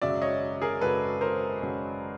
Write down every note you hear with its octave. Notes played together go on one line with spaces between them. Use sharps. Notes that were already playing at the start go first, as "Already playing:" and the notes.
G#1 F#2 C#3 F#3 D5 E5
C#5 D#5
G#4 A#4
G#1 F#2 C#3 F#3 A4 B4
A#4 C5
G#1 F#2 C#3 F#3